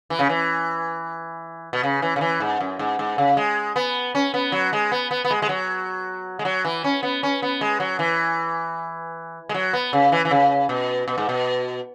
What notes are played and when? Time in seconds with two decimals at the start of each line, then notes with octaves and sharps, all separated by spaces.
0.10 E3
0.19 C#3
0.29 E3
1.73 B2
1.83 C#3
2.02 E3
2.16 C#3
2.21 E3
2.40 G#2
2.61 F#2
2.79 G#2
2.99 G#2
3.18 C#3
3.37 G#3
3.76 B3
4.15 C#4
4.34 B3
4.52 F#3
4.73 G#3
4.92 B3
5.11 B3
5.25 B3
5.31 G#3
5.42 G#3
5.49 F#3
6.39 G#3
6.45 F#3
6.65 E3
6.84 C#4
7.03 B3
7.23 C#4
7.42 B3
7.61 G#3
7.80 F#3
7.99 E3
9.49 G#3
9.54 F#3
9.73 B3
9.93 C#3
10.12 E3
10.25 E3
10.31 C#3
10.69 B2
11.08 B2
11.18 G#2
11.29 B2